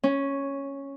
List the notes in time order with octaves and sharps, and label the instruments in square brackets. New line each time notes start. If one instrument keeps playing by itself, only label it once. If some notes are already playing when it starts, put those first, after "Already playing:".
[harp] C#4